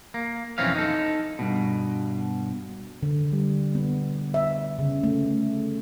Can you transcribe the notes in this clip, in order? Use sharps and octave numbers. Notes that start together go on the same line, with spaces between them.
A#3
B1 F2 E3 C4 C#4 F5
D#4 A4
G2 B2
D3
G3
B3
E5
C#3
A3